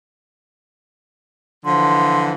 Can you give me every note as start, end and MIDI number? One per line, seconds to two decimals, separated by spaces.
1.66 2.32 50
1.66 2.32 52
1.66 2.32 53
1.66 2.22 84